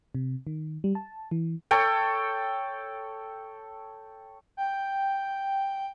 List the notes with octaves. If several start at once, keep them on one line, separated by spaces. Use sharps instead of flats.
C3
D#3
G3
A5
E3
A4 C#5 G5
G5